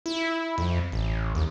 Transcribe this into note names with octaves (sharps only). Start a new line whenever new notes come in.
E4
F2
A1
D#2